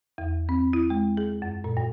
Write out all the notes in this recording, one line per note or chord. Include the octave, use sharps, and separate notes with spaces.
E2
C4
E4
G#3
G#4
F#2
A#2
G2